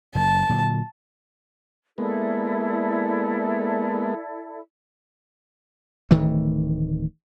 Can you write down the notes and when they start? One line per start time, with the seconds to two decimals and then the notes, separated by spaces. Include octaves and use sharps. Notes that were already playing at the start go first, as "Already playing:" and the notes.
0.15 F#1 F#2 A5
0.49 A#2 D3 F#3
1.98 G#3 A#3 B3 E4 A4 D5
6.11 D1 D#3 E3 A3